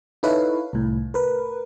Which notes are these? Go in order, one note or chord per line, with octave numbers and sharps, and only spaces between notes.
D#4 E4 A4 B4 C#5 F5
C2 A2
A#4 B4